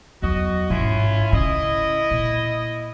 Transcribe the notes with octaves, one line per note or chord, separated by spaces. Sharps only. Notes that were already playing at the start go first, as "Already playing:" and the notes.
E2 F#3 F#4 D#5
A1 G#2 C#4 E4 F4
C#3 E4 D#5
A#2